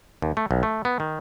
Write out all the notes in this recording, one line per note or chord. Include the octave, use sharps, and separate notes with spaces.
D#2
A3
B1
A3
B3
D#3